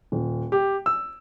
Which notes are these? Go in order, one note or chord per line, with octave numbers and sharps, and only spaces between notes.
D#1
G4
E6